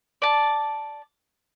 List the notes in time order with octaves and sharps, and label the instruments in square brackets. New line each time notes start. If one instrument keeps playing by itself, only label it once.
[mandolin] D5 A5